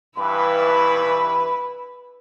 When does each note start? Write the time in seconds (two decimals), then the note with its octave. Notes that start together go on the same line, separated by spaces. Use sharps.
0.18 G2 E3 E4 B4 B5